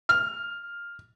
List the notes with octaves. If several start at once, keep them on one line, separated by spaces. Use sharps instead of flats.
F6